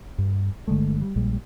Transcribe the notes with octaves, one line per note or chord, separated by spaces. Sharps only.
G2
G1 D3 G#3 A3
G3
A#1 A#2 G3 G#3